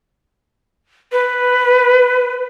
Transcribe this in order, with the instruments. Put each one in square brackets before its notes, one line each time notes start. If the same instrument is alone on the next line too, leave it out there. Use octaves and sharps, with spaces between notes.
[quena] B4